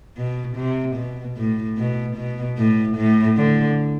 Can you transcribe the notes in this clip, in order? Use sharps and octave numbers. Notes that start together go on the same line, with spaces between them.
B2
C3
B2
A2
B2
B2
A2
A2
D3